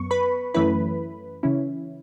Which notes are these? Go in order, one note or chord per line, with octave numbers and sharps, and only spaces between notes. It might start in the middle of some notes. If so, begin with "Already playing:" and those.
Already playing: F#2 B3 C#6
B4 B5
F#2 E3 A3 C#4 E4 B4 B5
C#3 E3 C#4 E4